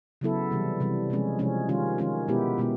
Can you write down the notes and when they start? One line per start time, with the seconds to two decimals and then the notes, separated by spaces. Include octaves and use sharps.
0.21 C#3 F#3 B3 E4 A4
0.51 C3 E3 G3
0.80 C3 E3 G3
1.10 C3 F3 G#3 C#4
1.39 C3 F3 G#3 C#4
1.69 D#3 G#3 C#4 F4
1.98 D#3 G#3 C#4 F4
2.28 B2 G#3 B3 E4 G4
2.58 B2 G#3 B3 E4